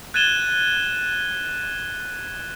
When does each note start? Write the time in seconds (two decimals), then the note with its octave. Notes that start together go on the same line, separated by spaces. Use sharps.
0.14 F#6 G#6 A6 D#7 E7 G7